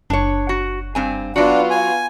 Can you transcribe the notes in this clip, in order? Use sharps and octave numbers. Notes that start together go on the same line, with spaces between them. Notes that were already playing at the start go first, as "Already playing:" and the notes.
F#1 D4 C#5
F#4
G2 C4 G#5
F#3 B3 D4 F4 F#4
G#5